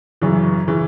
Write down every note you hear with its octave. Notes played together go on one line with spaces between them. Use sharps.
F#2 C#3 E3
C#3 E3